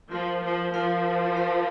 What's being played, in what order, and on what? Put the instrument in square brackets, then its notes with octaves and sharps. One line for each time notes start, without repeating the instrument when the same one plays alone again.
[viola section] F3 [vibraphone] F4 A#4 F5
[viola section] F3
[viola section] F3 [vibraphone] F4 A#4 F5
[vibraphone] F4 A#4 F5